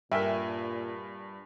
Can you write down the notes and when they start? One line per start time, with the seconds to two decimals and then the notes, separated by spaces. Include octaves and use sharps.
0.12 G2 A#2 A#4 E5 G5 G#5